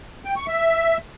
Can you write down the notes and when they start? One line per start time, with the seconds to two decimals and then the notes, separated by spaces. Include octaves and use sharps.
0.25 G5
0.36 C#6
0.48 E5